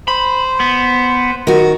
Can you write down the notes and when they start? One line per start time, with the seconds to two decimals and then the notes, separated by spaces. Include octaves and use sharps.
0.08 C5 B5
0.60 B3
1.47 D#3 F#4